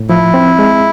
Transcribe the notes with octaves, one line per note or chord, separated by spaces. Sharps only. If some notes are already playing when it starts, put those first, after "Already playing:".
Already playing: A2
F3 E4
C4
G#3